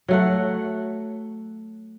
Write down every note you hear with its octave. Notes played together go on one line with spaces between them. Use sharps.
F#3 A3 F#5